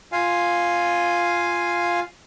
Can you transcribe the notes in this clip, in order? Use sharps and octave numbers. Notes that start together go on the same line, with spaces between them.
F4 F5 G#5